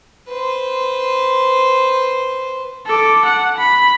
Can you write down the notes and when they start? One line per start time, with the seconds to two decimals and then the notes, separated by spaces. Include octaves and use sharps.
0.27 B4 C5
2.86 A4 D6
3.25 F#5
3.58 B5